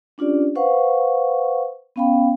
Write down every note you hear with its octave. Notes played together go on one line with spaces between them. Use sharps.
C#4 D4 F4 G4 D5
B4 C5 F5 F#5 C#6
B3 C#4 F5 G5 B5